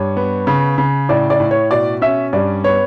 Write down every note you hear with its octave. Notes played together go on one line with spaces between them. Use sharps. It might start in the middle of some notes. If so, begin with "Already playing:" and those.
Already playing: G2 C#5
B3
C#3
C#3
A2 D5
D5
A2
C#5
B2 D5
C#4 E5
G2 D5
B3 C#5